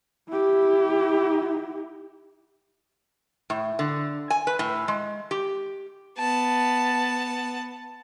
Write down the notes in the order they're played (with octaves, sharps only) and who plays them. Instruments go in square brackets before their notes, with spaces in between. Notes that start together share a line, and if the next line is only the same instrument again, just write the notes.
[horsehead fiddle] E4 G4
[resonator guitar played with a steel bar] A2
D3
G#5
B4
A2
G#3
G4
[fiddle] B3 A5